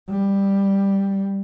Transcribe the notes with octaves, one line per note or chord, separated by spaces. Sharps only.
G3